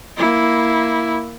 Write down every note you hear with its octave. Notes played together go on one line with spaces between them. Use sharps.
A#3 E4